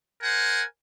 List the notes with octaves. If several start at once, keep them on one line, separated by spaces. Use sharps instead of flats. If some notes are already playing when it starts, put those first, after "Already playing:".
A#4 C5 F#5 G#5